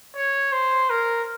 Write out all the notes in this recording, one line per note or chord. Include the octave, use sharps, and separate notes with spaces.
C#5
C5
A#4